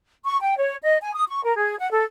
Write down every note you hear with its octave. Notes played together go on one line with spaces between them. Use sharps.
C#6
G5
C#5
D#5
G#5
D#6
C#6
A#4
G#4
F#5
A4